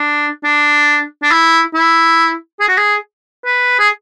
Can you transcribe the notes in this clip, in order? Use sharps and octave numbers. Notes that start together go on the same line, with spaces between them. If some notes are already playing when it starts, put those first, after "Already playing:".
Already playing: D4
D4
D4
E4
E4
G#4
F#4
G#4
B4
G#4